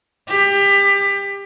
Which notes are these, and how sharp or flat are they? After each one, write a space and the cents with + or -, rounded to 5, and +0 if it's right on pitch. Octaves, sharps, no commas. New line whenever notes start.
G4 +25